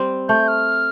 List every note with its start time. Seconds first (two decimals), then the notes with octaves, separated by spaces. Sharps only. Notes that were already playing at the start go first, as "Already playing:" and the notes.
Already playing: G3 C4
0.29 A3 G6
0.48 F6